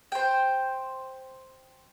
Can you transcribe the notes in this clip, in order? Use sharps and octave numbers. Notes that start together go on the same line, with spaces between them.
C5 G5